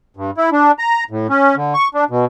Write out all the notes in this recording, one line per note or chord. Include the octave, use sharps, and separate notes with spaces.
G2
E4
D4
A#5
A2
C#4
D3
C#6
D4
B2